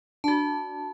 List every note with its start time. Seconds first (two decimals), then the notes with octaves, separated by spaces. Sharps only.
0.24 D4 F#4 A5